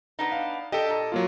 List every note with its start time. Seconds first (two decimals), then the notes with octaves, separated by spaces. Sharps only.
0.19 B3 D4 D#4
0.32 F5
0.72 D4 G4 A4 D#5
0.90 A#2
1.12 F#3 A#3 F4